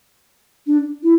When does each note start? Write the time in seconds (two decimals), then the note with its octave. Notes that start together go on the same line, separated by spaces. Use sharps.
0.67 D4
1.03 E4